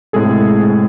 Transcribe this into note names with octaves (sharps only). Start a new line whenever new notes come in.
A2 C3 G#3 G#4 A4